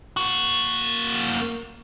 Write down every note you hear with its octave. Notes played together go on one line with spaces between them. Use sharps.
A#3 F#4